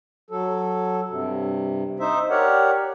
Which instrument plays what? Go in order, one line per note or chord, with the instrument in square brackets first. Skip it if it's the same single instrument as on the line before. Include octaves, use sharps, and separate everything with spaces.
[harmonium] F#3 A4
G2 C3
D#4 C5 E5
G4 A#4 C#5 D5 F#5